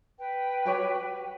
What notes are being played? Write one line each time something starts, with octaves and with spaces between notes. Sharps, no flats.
B4 G5
F#4 G4 C#5